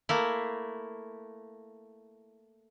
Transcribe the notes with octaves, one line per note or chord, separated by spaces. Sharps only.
A3 A#3 E4